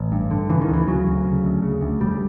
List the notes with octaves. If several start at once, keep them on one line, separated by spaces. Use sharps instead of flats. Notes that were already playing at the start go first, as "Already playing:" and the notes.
Already playing: A1
G2
D3
C#3 E3
D#3
D2 E3
C#3 F#3
D2
C#3
D2
C#3
D2
F1 G3